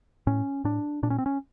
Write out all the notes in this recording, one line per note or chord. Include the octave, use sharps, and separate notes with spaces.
A2 C#4
A2 D4
A#2 D4
C#4
C4
C#4